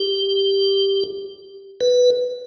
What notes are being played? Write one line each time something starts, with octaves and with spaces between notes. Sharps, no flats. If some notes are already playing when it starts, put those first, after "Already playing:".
Already playing: G4
B4